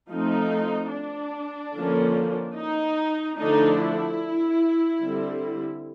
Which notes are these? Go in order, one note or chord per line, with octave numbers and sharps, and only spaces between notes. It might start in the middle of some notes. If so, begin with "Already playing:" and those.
F3 A3 C4 D#4
D4
D3 F3 A#3 C#4
D#4
D3 F3 A3 D4 D#4
E4
D3 G3 C4